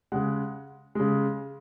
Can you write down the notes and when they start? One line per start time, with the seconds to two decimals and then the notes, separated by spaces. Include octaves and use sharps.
0.12 C#3 G#3 F#5
0.95 C#3 G#3